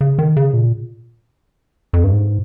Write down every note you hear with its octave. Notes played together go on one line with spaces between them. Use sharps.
C#3
D#3
C#3
A#2
F2
G2
G#2